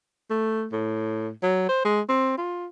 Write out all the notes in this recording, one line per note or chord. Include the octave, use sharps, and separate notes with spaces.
A3
A2
F#3
C5
G#3
C4
F4